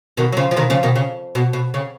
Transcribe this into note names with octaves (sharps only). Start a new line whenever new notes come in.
B2 D#3
F#3
C#3 F3
F3
B2 D#3
C#3 F3
B2 D#3
C#3
B2
B2
C#3